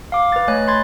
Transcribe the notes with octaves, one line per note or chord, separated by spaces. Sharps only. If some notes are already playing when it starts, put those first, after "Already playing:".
F5 D6
B4 A6
A3 C#5 D#5 G#5 F#6
B5 C6 G#6 A6